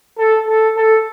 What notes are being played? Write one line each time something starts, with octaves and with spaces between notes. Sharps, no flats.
A4
A4
A4